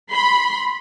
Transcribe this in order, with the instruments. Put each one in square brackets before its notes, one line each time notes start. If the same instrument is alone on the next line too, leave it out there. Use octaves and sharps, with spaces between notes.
[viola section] B5 C6